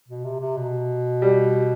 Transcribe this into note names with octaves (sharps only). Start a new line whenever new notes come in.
B2
C3
C3
B2
G3